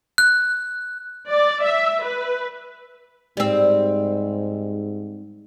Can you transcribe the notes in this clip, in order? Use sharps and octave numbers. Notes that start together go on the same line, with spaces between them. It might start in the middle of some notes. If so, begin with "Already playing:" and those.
F#6
D5
E5
B4
G#2 G3 C4